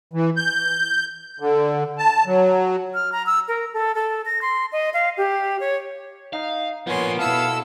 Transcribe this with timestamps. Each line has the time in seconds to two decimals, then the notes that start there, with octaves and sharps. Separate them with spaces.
0.13 E3
0.37 G6
1.40 D3
1.98 A5
2.26 F#3
2.94 F6
3.12 A#5
3.26 E6
3.48 A#4
3.74 A4
3.95 A4
4.26 A#6
4.42 C6
4.72 D#5
4.94 F5
5.17 G4
5.60 C#5
6.33 D#4 F5
6.87 F3 A#3 B3 C#5 G#5 C6
7.19 B2 E4 A4 F5 E6